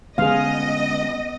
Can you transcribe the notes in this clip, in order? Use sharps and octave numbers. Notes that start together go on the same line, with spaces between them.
D3 G#3 B3 C#4 G#4 D#5 F5